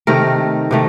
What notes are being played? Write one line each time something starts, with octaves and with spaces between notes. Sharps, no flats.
C3 D#3 A3 A#4
C3 D#3 A3